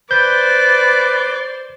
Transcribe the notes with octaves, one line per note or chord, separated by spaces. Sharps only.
B4 C5 D5 G6